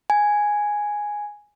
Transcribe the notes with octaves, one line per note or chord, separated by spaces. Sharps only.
G#5